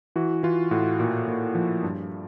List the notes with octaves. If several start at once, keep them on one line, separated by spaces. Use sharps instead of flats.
E3 F#4
E3 F4
A2 F#4
A#2
A#2
F3
G2